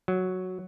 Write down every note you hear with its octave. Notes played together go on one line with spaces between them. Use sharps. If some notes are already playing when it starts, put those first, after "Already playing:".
F#3